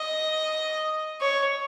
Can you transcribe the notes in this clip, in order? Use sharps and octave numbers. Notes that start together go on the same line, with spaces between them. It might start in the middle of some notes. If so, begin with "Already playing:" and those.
Already playing: D#5
C#5